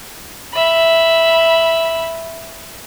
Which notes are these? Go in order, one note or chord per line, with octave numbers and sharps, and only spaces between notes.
E5 B5